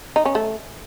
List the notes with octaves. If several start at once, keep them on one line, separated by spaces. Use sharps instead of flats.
D#4
C#4
A3